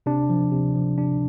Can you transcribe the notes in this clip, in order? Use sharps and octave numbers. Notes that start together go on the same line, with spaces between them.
C3 D4
F3
C3
F3
C3 D4